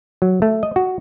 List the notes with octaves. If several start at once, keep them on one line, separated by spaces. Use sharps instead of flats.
F#3
A3
D#5
F#4